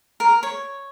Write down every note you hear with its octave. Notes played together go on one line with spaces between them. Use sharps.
A#4
C#5